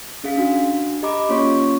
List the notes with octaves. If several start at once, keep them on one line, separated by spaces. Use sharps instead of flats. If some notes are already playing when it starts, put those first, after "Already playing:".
C#4 G#4 F5 B6
D4 F#4
G4 D#5 A#5 B5 D6
A#3 C#4 F4 C#5 C6 C#6